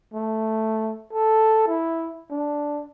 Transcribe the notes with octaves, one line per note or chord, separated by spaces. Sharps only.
A3
A4
E4
D4